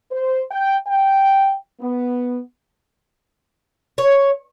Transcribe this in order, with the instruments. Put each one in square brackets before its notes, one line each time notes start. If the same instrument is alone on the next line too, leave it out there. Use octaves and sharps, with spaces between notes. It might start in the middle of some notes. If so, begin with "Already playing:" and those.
[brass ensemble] C5
G5
G5
B3
[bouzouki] C#5